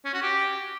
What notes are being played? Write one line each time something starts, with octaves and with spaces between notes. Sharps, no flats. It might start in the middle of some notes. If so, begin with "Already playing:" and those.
C#4
F#4
G4